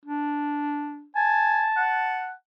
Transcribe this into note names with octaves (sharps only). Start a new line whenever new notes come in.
D4
G#5 A5
F#5